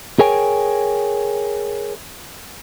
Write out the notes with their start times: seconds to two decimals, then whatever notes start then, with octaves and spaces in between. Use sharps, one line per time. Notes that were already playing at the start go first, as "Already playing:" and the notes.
0.19 G#4 A#4 C#5 G5 G#5